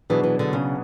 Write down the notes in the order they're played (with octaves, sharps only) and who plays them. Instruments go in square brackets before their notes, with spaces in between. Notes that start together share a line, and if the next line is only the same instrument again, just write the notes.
[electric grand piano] B2 F#3 B3 D4 G#4 [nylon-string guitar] E3
[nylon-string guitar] E3
D3
C#3